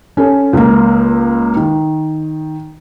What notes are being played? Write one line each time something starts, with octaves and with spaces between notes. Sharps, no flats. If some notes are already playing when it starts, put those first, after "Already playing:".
C#4 A4
C#2 A#3
D#3